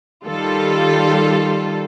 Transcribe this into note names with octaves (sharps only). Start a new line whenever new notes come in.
D#3 G3 F4 A4